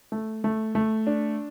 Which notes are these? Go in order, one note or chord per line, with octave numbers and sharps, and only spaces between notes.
A3
A3
A3
D4